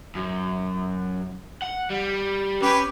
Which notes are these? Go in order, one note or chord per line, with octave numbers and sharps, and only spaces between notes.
F#2
F#5
G3
C#4 G4 B4